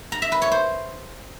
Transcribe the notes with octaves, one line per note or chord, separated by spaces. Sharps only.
A#5
E5
B4
C#5
C5